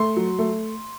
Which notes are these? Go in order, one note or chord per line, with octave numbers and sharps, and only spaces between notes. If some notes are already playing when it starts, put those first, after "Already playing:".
Already playing: A3 C6
F#3
A3